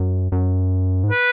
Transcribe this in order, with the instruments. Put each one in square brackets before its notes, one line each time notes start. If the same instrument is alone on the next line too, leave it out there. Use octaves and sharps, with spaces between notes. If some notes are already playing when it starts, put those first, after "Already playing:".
Already playing: [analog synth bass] F#2
F#2
G#2
[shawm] B4